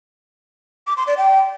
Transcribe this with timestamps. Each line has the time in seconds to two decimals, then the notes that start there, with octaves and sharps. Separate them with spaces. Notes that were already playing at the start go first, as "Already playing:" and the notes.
0.87 D6
0.97 C6
1.07 D5
1.17 G5